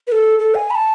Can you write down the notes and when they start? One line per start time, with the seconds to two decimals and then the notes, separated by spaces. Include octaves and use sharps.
0.07 B4
0.12 A4
0.39 A4
0.55 G#5
0.70 B5
0.75 A5